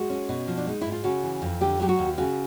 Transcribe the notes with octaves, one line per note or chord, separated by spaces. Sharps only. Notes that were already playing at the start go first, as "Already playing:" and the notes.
Already playing: G#3 F#4
C#4
B2
F3
D4
G#3 D#4
G#2 E4
F4
C#3 F#4
E3
F2
D3 G4
F#3 G4
F#4
D#2
C#3 F#4